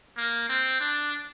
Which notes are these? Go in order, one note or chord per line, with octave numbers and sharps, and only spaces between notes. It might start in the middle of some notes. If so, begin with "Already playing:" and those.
A#3
C4
D4